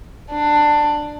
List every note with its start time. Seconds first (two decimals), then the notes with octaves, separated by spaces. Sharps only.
0.31 D4